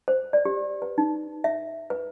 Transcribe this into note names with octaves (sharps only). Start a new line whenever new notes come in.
C5
D5
G4
B4
D#4
E5
B4